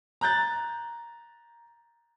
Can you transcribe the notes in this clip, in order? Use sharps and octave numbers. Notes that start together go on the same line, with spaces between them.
A#5 F#6 G6 A6